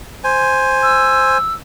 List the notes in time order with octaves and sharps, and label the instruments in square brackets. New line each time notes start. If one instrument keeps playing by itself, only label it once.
[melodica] C5 G#5
[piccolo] E6